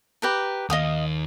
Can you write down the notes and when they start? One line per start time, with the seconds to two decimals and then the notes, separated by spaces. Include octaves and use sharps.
0.22 G4 B4 A#5
0.70 D#2 D#5 F5 D#6